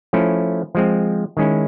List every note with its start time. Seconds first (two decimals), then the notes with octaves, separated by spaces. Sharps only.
0.13 F3 A3 C#4 E4
0.75 F3 G#3 C4
1.37 D#3 G#3 C#4 E4